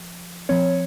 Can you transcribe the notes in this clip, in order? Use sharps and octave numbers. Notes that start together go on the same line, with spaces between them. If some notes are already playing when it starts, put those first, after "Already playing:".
Already playing: F3
F3 C4 C#5